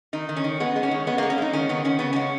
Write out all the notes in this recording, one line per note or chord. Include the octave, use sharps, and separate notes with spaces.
D#3 D#4
D#3
C#4
D#3
G#3 B3
G#3
C#4
D#3
G#3 B3
G#3 A#3
C#4
G#3 D#4
D#3 C#4
D#3 B3
D#3 C#4
C#3 B3
G#3 C#4